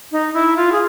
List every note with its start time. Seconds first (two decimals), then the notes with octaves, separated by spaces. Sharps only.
0.12 D#4
0.34 E4
0.57 F4
0.72 G#4